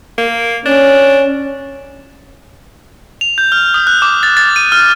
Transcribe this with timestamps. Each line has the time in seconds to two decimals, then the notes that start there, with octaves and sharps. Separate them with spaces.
0.18 A#3
0.66 C#4 D4
3.21 F7
3.38 G6
3.52 F6
3.74 D#6
3.87 F#6
4.02 D6
4.23 A6
4.37 A6
4.56 D#7
4.72 F6